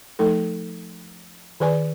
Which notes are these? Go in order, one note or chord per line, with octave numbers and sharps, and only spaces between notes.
F3 A3 D#4 A4
D#3 G#4 B4 D5 G#5